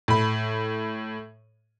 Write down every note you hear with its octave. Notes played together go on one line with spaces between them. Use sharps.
A2 B5